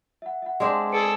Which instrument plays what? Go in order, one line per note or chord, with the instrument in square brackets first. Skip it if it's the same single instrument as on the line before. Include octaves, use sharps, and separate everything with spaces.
[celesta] E5 F#5
E5 F#5
[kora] G#3 C4 D4
[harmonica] G#4 A4 [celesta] B4 C#7 D7